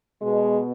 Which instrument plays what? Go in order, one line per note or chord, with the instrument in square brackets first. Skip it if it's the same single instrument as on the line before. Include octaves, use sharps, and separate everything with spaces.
[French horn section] B2 G#3